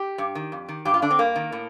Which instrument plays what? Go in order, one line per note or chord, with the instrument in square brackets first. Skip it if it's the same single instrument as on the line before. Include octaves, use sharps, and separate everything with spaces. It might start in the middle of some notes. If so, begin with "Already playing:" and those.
Already playing: [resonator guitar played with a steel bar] G4
G2
D#3
F2
D#3
G2 G4
F4
D3 D4
C4
G2 A#3
D#3
A2